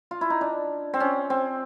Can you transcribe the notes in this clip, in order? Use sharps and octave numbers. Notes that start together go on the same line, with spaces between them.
F4
E4
D#4
D4
C4
C#4
C4